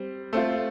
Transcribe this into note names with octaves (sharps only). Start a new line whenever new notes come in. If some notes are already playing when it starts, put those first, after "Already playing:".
Already playing: G3 C4
A3 C4 F4